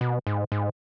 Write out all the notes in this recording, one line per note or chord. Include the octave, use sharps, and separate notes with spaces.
B2
G#2
G#2